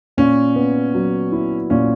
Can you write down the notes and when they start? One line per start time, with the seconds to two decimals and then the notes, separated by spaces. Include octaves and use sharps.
0.17 A#2 C#4
0.56 B3
0.94 F#3
1.32 E4
1.70 A#2 C#4